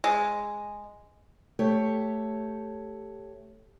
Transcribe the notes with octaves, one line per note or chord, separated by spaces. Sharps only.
G#3
A3 G4 C#5